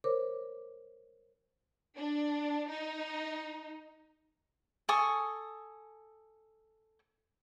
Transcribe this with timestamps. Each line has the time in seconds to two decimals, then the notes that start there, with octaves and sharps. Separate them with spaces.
0.04 A#4 C5 C#5 D6
1.97 D4
2.70 D#4
4.89 A4 G#5 C#6 D#6